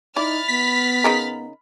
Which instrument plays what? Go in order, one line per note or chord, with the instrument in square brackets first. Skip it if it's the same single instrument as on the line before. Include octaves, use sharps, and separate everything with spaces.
[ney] D#4 [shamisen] E4 D5 [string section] B5 F6 A6
[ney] B3 [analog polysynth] B6
[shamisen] C#3 D#4 A#4